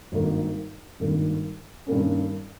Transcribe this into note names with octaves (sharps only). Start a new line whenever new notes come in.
G#1 G2 D#3 A#3
G#1 G2 D#3 A#3
G2 D#3 A#3 C#4